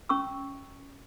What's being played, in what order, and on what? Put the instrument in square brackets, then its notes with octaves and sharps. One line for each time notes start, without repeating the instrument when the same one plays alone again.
[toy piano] C#4 C#6 E6